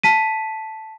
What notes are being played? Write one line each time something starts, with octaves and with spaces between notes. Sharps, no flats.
A5 B6 D#7